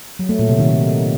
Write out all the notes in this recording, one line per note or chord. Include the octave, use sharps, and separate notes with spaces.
F#3
A3
A#2
C3
D#3